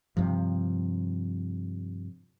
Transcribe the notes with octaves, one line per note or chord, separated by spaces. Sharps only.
G2 C3 F3